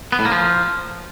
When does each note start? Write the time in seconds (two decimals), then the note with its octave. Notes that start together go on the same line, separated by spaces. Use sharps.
0.12 B3
0.19 A2
0.25 A#3
0.32 F3